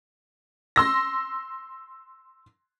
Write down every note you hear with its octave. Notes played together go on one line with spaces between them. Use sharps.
C6 E6 A#6